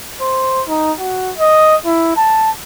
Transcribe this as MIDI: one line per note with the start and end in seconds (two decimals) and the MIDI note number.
0.21 0.62 72
0.68 0.92 63
0.99 1.32 66
1.38 1.76 75
1.85 2.13 64
2.17 2.51 81